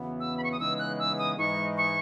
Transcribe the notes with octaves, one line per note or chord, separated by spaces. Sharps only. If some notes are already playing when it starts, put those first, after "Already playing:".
Already playing: E2 C#3 E3 B3 F#4
E6
B5
C#6
D#6
C#3 E3 G#3 B3 D#4 E6
F#6
E6
D#6
G#2 E3 G#3 D#4 C#6
C#6